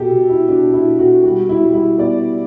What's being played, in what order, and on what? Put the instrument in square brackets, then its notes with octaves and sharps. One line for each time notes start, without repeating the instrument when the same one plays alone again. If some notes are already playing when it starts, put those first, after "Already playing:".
Already playing: [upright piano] B2 G4 A4
B2
E4
B2 D4
E4
B2
F#4
G3 F#4
E4
G3
E4
B3 D5